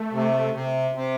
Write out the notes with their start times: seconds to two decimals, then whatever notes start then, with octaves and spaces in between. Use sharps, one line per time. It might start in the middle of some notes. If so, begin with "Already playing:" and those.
Already playing: A3
0.12 C3
0.53 C3
0.95 C3